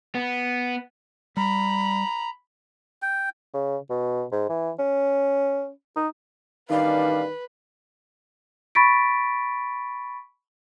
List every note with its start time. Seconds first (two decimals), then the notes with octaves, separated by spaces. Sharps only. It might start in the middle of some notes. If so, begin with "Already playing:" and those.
0.15 B3
1.37 G3 A#5 B5
3.02 G5
3.53 C#3
3.90 B2
4.32 G#2
4.49 E3
4.79 C#4
5.96 D#4
6.70 A1 D#3 G3 D4 B4 F5
8.75 B5 C#6 A6 B6 D7